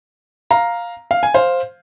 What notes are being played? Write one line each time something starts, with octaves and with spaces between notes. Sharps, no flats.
F5 A#5
F5
G#5
C5 F5